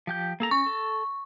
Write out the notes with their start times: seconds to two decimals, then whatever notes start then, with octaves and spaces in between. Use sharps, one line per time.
0.07 F3 G4 G6
0.40 A#3 A4 A#5
0.51 C#4 C#6
0.66 A4